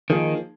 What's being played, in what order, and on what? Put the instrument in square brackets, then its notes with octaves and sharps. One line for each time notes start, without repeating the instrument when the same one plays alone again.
[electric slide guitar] D#3 [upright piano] F3 A#3 D#4 G#4